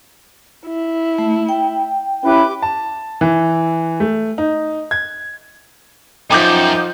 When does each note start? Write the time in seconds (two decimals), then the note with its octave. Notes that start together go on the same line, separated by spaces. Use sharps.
0.67 E4
1.18 A3
1.49 G5
2.24 C#4 E4 G4 B4 D6
2.62 A5
3.21 E3
4.00 A3
4.38 D#4
4.91 G#6
6.30 F#2 F3 D#4 G5 D6 G6